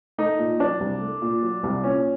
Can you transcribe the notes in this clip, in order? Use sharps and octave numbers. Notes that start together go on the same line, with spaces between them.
A3 D#4
A#2
F#3 D4
C2
A3
A#2
F#3
C2
A#2 C#4